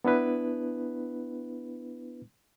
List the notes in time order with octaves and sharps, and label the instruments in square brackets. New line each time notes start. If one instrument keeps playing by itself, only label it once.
[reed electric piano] B3 D4 E4 B4